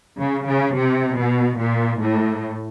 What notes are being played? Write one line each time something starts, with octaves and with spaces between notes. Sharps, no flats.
C#3
C#3
C3
B2
A#2
A2